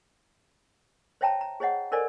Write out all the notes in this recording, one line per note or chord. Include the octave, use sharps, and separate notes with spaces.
C5 C#5 E5 G5 A5 A#5
A#5
G#4 C5 C#5 D#5 F#5
A4 A#4 C5 D5 D#5 G#5